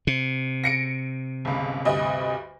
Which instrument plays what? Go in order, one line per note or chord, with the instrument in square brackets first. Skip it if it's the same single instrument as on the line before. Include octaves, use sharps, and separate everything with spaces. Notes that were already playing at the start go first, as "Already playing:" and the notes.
[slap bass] C3
[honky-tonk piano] A#6 C#7 D7
G1 C#2
D2 G2 D#5